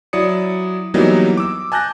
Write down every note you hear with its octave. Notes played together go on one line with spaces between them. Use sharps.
F#3 E4 D5 D#6 C#7
E3 F#3 G3 A#3 B3 D#4
D6 E6
G#5 A5 F#6 G6 A#6